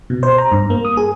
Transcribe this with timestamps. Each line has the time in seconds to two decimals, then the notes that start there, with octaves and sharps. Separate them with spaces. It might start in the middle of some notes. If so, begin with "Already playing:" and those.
0.10 B2
0.23 C5
0.38 A#5
0.51 G2
0.70 A#3
0.85 D#6
0.97 G#4